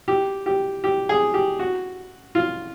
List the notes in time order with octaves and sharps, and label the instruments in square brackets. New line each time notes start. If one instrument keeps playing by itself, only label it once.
[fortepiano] G4
G4
G4
G#4
G4
F#4
F4